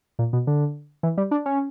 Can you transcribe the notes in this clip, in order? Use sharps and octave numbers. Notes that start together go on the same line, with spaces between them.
A#2
B2
D3
E3
G3
D4
C#4